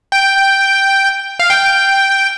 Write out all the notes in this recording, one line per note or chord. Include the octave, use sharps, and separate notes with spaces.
G5
F5
G5